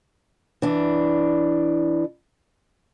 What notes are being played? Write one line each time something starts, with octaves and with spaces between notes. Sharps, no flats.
E3 D4